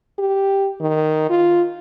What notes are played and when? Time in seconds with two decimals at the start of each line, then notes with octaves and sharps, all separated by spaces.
0.19 G4
0.81 D#3
1.30 F4